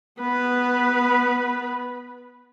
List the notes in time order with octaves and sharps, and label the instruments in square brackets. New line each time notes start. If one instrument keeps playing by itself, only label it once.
[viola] B3 B4